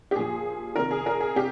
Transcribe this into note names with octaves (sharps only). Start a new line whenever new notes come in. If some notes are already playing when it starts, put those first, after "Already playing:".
G4
A#2 F3 G#4
C3 D#3 A#4
G#4
A#4
G#4
C3 G4